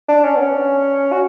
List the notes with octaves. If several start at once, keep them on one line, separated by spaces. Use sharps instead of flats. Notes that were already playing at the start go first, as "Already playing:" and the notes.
D4
C#4
B3
C#4
F#4